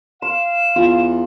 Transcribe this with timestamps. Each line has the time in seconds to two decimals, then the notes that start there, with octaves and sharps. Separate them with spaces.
0.22 F5 C6 E7
0.76 E2 F4